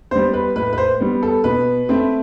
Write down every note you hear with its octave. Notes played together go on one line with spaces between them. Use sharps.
G3 B3 C5
B4
A2 B4
B4
C5
G3 B3
A4
B2 B4
A3 C4